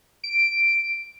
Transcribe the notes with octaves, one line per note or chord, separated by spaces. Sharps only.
D7